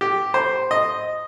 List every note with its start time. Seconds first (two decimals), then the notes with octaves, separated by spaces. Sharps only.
0.01 G4
0.34 C5
0.71 D#5